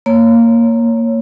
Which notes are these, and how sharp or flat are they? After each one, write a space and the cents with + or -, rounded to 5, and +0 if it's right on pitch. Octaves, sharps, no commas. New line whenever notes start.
A#3 -10 C#5 +0